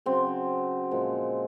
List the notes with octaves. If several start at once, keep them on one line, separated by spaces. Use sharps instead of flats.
C#3 F#3 C4
A#2 F3 G#3